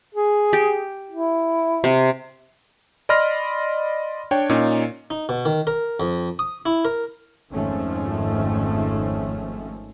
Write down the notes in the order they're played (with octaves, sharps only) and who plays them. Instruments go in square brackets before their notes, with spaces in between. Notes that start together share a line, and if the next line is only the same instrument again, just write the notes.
[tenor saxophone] G#4
[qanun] G4
[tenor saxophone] E4
[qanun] C3
[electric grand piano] D5 D#5 B5 C6 F6 A#6
D4 C#5 G5
A#2 C#4 D#4
[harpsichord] D#4
B2
D#3
A#4
F2
D#6
E4
A#4
[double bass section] G#1 F2 D#3 F3 A3 C#4